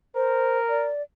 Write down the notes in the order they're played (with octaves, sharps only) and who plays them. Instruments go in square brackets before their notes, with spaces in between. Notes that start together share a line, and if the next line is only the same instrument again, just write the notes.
[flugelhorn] A#4 [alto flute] C5
[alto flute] D5